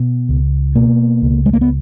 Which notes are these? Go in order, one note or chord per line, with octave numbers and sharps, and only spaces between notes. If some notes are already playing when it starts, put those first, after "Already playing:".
Already playing: B2
C#2
B2 A#3
C#2
G#3
A#3
B3